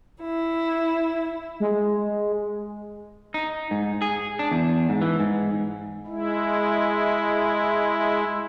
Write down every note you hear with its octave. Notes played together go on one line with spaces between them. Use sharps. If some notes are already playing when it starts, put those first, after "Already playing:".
E4
G#3
D#4
G#2
G#4
D4
E2
G#2
E3
G#2
G#3 E4